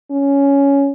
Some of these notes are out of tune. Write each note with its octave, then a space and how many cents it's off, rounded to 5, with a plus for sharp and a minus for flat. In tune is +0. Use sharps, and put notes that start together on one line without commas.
C#4 +10